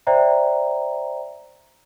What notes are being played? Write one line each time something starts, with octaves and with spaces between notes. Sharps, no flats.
C5 D5 E5 G5 A#5